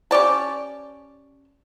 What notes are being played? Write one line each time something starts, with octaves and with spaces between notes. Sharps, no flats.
C#4 G4 D5 A5